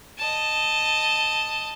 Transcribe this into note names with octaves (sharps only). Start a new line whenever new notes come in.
D#5 A5